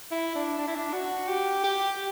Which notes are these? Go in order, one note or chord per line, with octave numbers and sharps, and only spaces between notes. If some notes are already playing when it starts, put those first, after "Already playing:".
E4
D4
D4
E4
D4
F#4
G4
G4